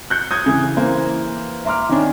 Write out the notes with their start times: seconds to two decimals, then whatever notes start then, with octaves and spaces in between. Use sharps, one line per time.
0.10 F#6 G6 C#7
0.31 D#6 G6 G#6
0.46 C#3 E3
0.77 E3 A#3 C5
1.65 E5 A#5 C6 D6 F6
1.89 D#3 C#4 D4